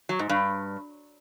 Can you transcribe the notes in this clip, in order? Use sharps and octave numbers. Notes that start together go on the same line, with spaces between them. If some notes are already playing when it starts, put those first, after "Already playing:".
F#3
G#2
G2